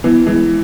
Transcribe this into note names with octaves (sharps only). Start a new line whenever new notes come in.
E3 B3
E3 G#3